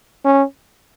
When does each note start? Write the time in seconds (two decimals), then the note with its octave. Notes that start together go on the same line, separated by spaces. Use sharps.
0.25 C#4